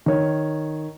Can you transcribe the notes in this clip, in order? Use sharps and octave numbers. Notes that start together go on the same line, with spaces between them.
D#3 C#5